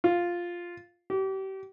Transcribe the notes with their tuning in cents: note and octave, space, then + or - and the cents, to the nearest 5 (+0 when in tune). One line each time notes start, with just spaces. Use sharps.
F4 +0
G4 -35